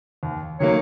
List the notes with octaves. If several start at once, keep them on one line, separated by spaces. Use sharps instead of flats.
D#2
D#3 F#3 A#3 C#5